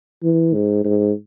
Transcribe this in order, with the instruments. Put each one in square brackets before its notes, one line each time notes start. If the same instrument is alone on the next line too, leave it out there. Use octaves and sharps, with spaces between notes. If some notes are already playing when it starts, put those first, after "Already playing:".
[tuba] E3
G#2
G#2